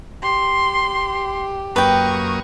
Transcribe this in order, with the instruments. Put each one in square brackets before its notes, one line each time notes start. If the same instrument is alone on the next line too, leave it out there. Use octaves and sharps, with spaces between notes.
[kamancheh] G4 [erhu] C6
[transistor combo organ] F#2 A#3 D#6 [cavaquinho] B4 G5 [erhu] C#6